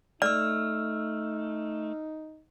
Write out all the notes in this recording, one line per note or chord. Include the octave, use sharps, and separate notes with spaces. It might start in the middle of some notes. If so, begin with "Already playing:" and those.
A3 D#4 D5 E6 F6